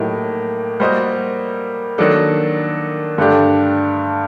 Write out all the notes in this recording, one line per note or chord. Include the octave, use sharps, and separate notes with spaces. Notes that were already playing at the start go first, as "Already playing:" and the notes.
Already playing: A2 F#3 A#3 D#4 G4
G3 A#3 F#4 C5 D#5
D#3 F#3 A#3 D4 A4
G2 D3 A3 D4 G4